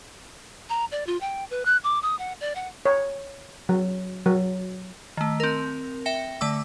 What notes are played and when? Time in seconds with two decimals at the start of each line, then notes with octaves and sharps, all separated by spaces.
0.69 A#5
0.92 D5
1.07 F4
1.21 G5
1.51 B4
1.65 F#6
1.84 D6
2.03 D#6
2.19 F#5
2.41 D5
2.55 F#5
2.86 C#5
3.69 F#3
4.26 F#3
5.17 D#3 A3
5.40 C4 A#4
6.06 E5 G5 A#6 C#7
6.41 D3 A3 A5 D6 E6